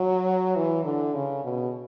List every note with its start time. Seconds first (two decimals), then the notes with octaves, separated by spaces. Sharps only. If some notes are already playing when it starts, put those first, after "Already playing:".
Already playing: F#3
0.56 E3
0.85 D3
1.14 C#3
1.44 B2